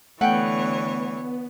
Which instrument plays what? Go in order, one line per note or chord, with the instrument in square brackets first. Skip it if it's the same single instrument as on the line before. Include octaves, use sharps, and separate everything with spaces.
[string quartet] D3 E3 C#5 [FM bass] A3 [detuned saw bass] B3 [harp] F#5 G5